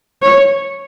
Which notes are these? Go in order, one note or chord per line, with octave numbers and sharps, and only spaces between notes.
C#5